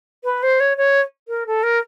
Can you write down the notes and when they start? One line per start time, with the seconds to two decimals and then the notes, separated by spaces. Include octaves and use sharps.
0.24 B4
0.43 C5
0.60 C#5
0.77 C#5
1.28 A#4
1.46 A4
1.63 A#4